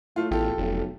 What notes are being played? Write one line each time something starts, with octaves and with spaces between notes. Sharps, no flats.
A2 A3 F4
A1 E2 F4 G4 A4
F1 B1